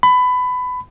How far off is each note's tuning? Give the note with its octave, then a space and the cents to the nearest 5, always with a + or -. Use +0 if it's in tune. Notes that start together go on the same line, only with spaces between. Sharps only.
B5 +20